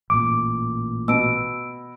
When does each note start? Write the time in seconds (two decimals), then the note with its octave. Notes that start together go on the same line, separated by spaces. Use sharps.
0.10 A1 A#2 D6
1.08 B2 E6 D7